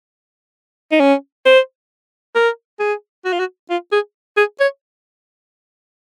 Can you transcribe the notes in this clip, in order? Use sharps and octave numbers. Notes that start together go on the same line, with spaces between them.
D#4
C#4
C5
A#4
G#4
F#4
F4
F#4
F4
G#4
G#4
C#5